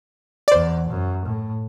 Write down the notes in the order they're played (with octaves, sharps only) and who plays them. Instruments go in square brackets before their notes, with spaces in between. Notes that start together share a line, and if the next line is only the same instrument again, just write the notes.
[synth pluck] D5
[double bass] E2 [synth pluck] C5
[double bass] F#2
A2